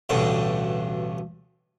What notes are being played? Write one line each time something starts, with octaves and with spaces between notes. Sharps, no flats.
A1 D2 G2 B2